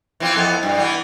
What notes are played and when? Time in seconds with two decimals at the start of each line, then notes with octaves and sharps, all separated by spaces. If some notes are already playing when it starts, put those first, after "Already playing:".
0.20 E3 C4 F4
0.35 F2 B3 A4
0.63 G2 B2
0.79 E3 B3